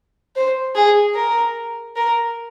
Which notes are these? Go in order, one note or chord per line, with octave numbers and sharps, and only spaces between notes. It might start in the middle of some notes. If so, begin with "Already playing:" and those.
C5
G#4
A#4
A#4